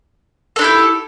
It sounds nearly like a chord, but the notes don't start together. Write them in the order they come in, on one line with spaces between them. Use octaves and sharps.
A4 D4 E4 G4